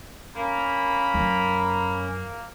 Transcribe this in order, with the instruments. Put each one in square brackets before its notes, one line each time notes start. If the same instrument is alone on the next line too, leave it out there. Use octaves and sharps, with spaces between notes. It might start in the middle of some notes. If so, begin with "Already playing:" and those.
[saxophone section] A#3 [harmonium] C#4 [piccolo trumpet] B5
[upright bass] F#2